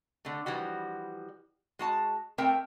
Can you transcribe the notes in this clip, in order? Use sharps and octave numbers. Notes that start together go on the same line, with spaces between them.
D3 A3
E3 F3 G3 F#4
G#3 F#4 A5
A3 C4 A#4 G5